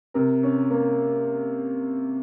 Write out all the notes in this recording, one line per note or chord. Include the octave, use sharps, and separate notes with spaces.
C3 A#4
C#4
A#3